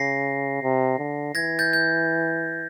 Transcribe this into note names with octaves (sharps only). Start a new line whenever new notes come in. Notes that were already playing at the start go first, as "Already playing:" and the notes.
Already playing: C#3 A#6 C7
C3
D3
E3 G#6 A#6
G6 A6
G6